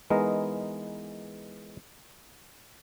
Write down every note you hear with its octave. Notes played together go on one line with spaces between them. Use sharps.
E3 G#3 B3 D#4 A#4 D#5